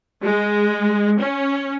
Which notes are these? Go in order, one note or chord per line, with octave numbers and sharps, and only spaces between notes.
G#3
C#4